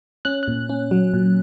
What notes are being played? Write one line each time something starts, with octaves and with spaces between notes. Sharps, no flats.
C#4 F#6
A#2 F#6
C#4
F#3
A#2